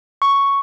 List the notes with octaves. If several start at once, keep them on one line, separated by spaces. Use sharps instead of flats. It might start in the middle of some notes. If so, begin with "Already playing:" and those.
C#6